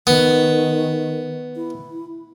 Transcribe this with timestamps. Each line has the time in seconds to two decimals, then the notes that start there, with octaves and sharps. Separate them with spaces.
0.07 D#3 B3
1.56 E4